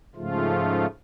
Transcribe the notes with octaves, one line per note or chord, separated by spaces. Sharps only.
G#2 C#3 F3 A3 F4